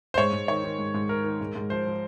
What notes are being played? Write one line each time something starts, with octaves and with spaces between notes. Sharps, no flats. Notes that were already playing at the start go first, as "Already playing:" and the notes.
C5
G#2 C#5
G#2
D#3 C#5
D#3
G#2
G#2
D#3 A#4
D#3
G#2
G#2
F3 C5
F3